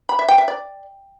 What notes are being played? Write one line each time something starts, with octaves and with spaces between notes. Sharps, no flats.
B5
E5
G5
E5
D5